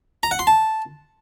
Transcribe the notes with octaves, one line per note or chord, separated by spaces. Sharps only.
A#5
F#5
C6
A5